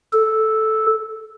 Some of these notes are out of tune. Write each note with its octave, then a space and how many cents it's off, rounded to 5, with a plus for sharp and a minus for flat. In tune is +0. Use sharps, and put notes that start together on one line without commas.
A4 -5